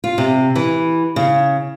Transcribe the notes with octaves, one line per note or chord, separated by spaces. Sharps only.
F4
C3
E3
C#3